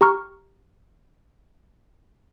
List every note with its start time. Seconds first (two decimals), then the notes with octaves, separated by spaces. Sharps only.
0.01 G4 A#5 C#6 F6